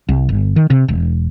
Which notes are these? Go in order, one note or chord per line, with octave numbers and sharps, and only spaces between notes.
C2
G1
D#3
C3
E1